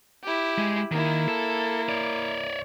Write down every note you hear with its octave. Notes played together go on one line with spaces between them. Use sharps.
E4 G4
G#3
D#3 A#3 E4
A4
C#5 D5